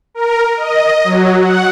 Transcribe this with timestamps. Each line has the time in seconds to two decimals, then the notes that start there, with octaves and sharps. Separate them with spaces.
0.14 A#4
0.57 D#5
1.04 F#3
1.41 F#5